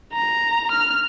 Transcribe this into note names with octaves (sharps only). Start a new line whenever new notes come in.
A#5
F6